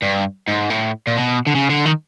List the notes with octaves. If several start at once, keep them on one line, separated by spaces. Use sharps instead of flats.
G2
G#2
A2
A#2
B2
D3
C#3
D3
D#3